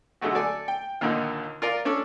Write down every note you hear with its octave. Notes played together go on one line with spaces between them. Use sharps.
D3 F#3 G#3 A3 F#4
A4 D5 G#5 A5
G5
D#2 A#2 D3 D#3
F4 A#4 D5
C#4 D4 A4